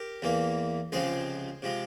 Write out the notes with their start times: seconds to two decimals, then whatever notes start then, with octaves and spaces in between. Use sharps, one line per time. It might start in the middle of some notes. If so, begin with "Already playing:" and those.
Already playing: G4 A#4
0.22 E2 E3 A#3
0.92 C#2 C3 F3 G#3 G#4 C5
1.62 C3 F3 G#3